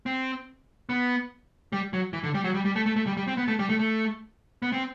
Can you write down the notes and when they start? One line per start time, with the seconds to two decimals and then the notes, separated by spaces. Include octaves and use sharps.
0.06 C4
0.89 B3
1.72 G3
1.93 F#3
2.13 E3
2.23 D3
2.34 G3
2.44 F#3
2.54 G3
2.65 G3
2.76 A3
2.86 A3
2.96 A3
3.06 G3
3.17 G3
3.27 C4
3.37 B3
3.48 A3
3.59 G3
3.69 A3
3.79 A3
4.62 B3
4.72 C4